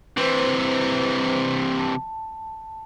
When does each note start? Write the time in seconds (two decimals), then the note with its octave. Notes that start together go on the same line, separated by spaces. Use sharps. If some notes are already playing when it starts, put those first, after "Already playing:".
0.17 C3 E3 B4 C5
1.77 A5